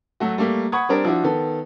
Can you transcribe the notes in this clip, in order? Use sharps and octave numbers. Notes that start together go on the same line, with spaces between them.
F#3 A3 F#4
G3 A3 A#3
F#5 B5 C#6 D#6 G#6
G3 C4 D4 A#4
F3 D4 E4 F#4
D#3 B3 A4